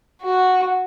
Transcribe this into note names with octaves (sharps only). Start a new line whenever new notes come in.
F#4